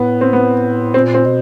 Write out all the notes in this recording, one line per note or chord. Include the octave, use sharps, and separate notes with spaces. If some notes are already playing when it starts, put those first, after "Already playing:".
Already playing: A2 B3
C4
B3
A#2 C4
C4
B2